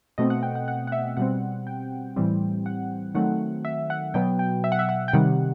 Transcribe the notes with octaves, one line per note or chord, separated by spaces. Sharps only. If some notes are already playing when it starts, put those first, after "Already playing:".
B2 A3 C4 D#5
F#5
G5
F#5
F#5
F#5
E5
B2 G3 C4 F#5
G5
A2 E3 G3 C4
F#5
D#3 F#3 A3 C4 F#5
E5
F#5
B2 F#3 B3 G5
G5
E5
F#5
E5
F#5
G5
C3 D#3 G3 F#5